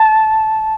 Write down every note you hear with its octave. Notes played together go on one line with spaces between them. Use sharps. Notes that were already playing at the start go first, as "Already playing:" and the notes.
Already playing: A5